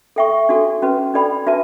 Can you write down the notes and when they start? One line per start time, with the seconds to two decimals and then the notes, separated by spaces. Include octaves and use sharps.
0.16 A4 E5 G5 C#6
0.49 D4 F#4 A4
0.82 C#4 F#4 B4
1.14 D4 A4 D5 G5 B5
1.46 D4 F#4 B4 E5 A5